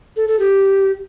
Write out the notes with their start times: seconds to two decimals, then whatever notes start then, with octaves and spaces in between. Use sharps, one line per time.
0.17 A4
0.28 A4
0.39 G4